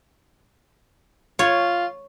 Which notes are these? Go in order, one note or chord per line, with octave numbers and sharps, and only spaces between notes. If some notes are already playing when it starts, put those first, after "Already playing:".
F4 C#5